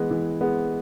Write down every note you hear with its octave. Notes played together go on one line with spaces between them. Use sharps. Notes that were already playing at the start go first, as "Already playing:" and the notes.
Already playing: E3 G#3 B3
E3
G#3 B3